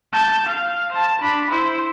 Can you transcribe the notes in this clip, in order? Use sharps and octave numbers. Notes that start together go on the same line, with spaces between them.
A5 G6
F5
C5 A5
D4 B5
E4 C5